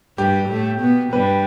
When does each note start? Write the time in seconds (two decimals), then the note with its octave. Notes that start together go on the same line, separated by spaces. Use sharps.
0.18 G2 G3 G4
0.49 A2 A3
0.81 B2 B3
1.12 G2 G3 B4